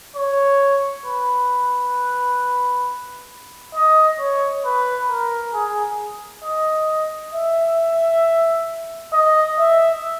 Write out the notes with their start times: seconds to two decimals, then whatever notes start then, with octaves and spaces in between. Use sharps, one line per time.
0.16 C#5
1.06 B4
3.75 D#5
4.20 C#5
4.65 B4
5.10 A#4
5.54 G#4
6.44 D#5
7.33 E5
9.13 D#5
9.59 E5